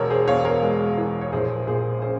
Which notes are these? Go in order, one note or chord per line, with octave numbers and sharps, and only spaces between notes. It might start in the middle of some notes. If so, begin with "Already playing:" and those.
Already playing: E1 A#4 C#5
G#4 C5
E2 C#5 F5
A#4 C#5
G#3
E3
C#5
A#1 G#4 C5
A#2 G#4 C5
C#4 G#4 C5